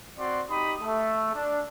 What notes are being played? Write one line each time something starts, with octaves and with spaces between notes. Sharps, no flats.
C4 F#4 D5 C6
D#4 G4 B5 D#6
A3
D4